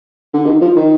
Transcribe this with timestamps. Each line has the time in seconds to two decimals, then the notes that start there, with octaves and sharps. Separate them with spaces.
0.34 D3
0.46 D#3
0.61 F3
0.76 D#3